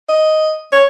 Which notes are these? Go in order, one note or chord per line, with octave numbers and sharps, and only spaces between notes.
D#5
C#5